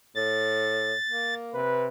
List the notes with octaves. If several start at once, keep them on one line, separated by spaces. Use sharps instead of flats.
A2 A6
A#3
C3 B4